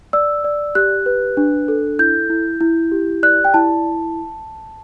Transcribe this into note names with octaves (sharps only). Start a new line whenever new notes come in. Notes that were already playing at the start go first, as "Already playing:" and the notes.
D5 E6
D5
G4 F#6
B4
D4
A4
E4 G6
E4
E4
G4
D5 F#6
G5
E4 A5